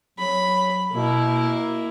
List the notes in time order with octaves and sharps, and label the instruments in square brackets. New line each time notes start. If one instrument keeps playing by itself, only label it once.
[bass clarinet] F#3 [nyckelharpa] B5
[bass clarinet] B2 [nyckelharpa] A#3 E4